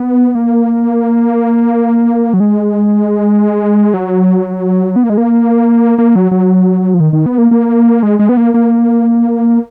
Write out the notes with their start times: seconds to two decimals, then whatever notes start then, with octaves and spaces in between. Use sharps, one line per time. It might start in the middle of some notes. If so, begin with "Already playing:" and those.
Already playing: B3
0.35 A#3
2.34 F#3
2.40 G#3
3.94 F#3
4.96 B3
5.04 A#3
5.10 G#3
5.17 A#3
5.98 A#3
6.16 F#3
6.31 F#3
6.94 F3
7.00 D#3
7.13 D#3
7.26 B3
7.38 A#3
7.51 A#3
8.03 G#3
8.19 G#3
8.29 B3
8.37 A#3
8.54 A#3